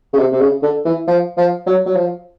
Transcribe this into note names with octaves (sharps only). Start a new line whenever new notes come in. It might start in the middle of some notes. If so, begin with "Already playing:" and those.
C#3
C3
C3
C#3
D3
E3
F3
F3
F#3
F#3
F3